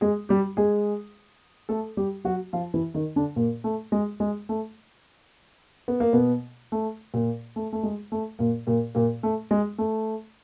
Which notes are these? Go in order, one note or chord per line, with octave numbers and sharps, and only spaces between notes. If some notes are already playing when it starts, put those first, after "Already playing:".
G#3 G#4
G3 G4
G#3 G#4
A3 A4
G3 G4
F#3 F#4
F3 F4
E3 E4
D#3 D#4
D3 D4
A#2 A#3
A3
G#3
G#3
A3
B3
A#3
B2 B3
A3
A#2 A#3
A3
A3
G#3
A3
A#2 A#3
A#2 A#3
A#2 A#3
A3
G#3
A3